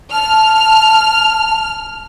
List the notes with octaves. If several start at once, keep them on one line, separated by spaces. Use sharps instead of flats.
A5 F6